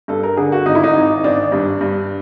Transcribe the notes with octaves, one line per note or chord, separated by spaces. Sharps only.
G2 A4
A#4
D3 G#4
F#4
G#1 D#4
E4
D#4
G#1
G#1 D4
G2
G2